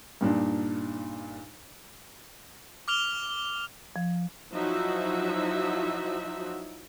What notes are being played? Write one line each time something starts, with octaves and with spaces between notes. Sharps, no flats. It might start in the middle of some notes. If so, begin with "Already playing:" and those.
G2 A#2 D4 D#4
D6 F6 F7 G7
F3
F3 F#3 D#4 E4 F#4 E5